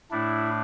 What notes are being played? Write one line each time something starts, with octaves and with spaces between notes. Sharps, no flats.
A2 A3 D4 E4